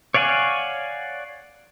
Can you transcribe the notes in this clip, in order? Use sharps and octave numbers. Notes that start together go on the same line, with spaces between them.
C#5 D5 F5 F#5 G#5